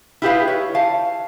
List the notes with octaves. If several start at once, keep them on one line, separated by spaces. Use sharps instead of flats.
E4 F4 G4 G#4 B4 F5
C#5
F5 A5